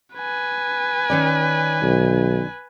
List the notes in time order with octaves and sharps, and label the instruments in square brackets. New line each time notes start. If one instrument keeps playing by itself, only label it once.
[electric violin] B4 G#5
[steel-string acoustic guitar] D#3 C#4 D5
[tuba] B1